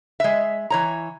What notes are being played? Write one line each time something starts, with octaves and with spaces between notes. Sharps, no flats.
G#3 E5
E3 C#5 A#5